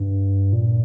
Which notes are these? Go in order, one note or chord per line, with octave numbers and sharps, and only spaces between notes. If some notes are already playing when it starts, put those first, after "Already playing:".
Already playing: G2
A#2